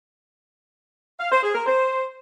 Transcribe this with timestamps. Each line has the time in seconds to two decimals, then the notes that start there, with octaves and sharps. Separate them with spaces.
1.20 F5
1.31 C5
1.43 G#4
1.55 A#4
1.66 C5